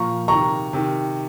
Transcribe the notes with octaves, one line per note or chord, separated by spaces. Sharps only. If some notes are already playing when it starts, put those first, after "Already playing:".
Already playing: A#2 F3 A#5 C#6
C3 D#3 A#5 C#6
C3 D#3